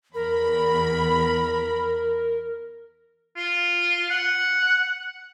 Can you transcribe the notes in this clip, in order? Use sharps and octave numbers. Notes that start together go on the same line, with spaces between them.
E2 A#4 B5
F4
F#5